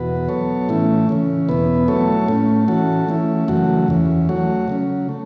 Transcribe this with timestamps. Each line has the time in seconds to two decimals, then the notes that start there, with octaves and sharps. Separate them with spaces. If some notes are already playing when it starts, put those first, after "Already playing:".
Already playing: E2 B2 F#4 B4
0.29 F#3 B3 A4 C#5
0.69 A2 E3 A3 C#4 E4
1.09 C#3 E3 C#4
1.49 E2 B2 B3 E4 B4
1.88 F#3 A3 E4 A4 C#5
2.28 A2 A3 C#4
2.68 E3 C#4 F#4 A4
3.09 E3 A3 C#4 E4
3.48 F#2 C#3 E3 A3 F#4
3.88 E2 E3 C#4
4.29 F#3 A3 F#4 C#5
4.68 C#3 F#3 C#4
5.09 A3